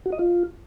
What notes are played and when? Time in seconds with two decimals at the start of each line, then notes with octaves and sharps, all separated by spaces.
0.06 F#4
0.12 D#5
0.19 F4